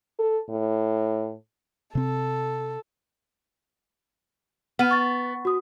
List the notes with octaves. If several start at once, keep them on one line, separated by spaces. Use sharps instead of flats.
A4
A2
C3 C4 A4
B3 F#5 F6 D#7
C#6 A6
F#4 D#6